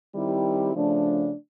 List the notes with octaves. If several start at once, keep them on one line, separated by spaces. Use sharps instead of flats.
D#3 G3 C4 E4 G4
C#3 F3 A3 D4